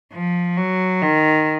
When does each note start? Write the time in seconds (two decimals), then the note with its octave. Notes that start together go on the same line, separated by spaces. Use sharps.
0.13 F3
0.57 F#3
1.02 D#3